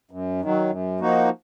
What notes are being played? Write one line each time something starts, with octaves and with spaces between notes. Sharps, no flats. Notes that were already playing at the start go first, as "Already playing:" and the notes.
F#2
D#3 F#3
F#2
F3 A#3 D#4 F#4